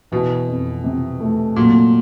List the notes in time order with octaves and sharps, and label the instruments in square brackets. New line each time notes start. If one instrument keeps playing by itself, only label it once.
[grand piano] B2 [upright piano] E3
[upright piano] F2
C3
A3
[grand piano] A#2 [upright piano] F#3